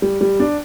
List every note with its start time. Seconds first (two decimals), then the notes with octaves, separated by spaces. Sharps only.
0.02 G3
0.21 G3
0.40 D4